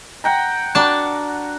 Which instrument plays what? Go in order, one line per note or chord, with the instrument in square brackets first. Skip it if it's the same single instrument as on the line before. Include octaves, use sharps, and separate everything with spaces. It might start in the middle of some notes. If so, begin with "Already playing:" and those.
[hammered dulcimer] F#5 G5 A#5
[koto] D4 A5 [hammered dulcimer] F#4 A#4